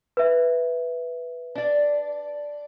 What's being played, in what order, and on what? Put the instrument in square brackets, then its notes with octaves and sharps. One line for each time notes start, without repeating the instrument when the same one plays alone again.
[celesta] B4 E5
[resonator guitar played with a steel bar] D4 D5